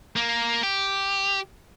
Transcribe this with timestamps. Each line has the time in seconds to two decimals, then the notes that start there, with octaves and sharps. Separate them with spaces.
0.16 A#3
0.63 G4